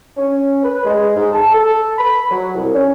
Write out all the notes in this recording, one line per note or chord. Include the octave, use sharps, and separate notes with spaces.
C#4
B4
G#3
G#2
A5
A4
B5
F#3
C2
C#4